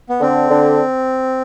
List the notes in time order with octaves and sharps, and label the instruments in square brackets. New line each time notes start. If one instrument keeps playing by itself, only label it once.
[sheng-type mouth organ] B3
[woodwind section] D3 [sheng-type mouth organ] C4
[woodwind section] D3